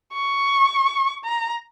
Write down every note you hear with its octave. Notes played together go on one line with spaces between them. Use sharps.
C#6
A#5